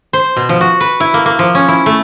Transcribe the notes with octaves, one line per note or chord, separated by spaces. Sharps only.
C5
B2
F3
F#4
B4
E4
A#3
A#3
F3
C#4
E4
A3